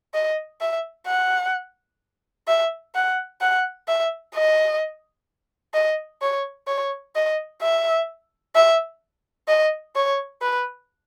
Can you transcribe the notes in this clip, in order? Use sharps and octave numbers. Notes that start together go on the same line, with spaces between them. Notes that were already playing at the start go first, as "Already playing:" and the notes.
D#5
E5
F#5
E5
F#5
F#5
E5
D#5
D#5
C#5
C#5
D#5
E5
E5
D#5
C#5
B4